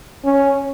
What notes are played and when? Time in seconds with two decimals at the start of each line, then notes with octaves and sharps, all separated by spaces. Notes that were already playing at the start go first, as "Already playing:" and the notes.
0.25 C#4